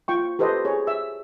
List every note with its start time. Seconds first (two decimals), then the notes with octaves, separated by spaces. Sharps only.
0.08 F4 G5 C#6
0.39 G4 A4 B4 C5 D#5
0.65 G#4 C#5
0.87 E5 E6